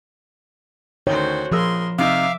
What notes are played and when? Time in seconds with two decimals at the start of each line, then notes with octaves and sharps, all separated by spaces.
1.07 D2 D#3 F#4 C5 C#5
1.51 A#1 F3 G#4 A#4 C6 E6
1.98 C3 D#4 E5 F5 D6 F6